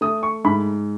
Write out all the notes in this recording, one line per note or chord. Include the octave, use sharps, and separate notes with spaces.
A3 D#6
C#6
G#2 B5